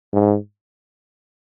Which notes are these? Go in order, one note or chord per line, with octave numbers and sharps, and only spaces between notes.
G#2